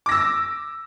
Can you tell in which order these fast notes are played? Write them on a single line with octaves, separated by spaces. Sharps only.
D6 A#6 E6